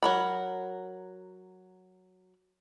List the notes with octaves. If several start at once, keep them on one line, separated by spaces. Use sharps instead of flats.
F#3 A#4 B5